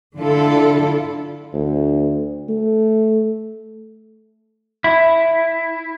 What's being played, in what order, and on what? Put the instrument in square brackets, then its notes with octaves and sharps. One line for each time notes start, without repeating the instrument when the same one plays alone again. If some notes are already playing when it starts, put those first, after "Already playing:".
[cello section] D3 E4 F4 A4
[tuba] D2
A3
[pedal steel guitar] E4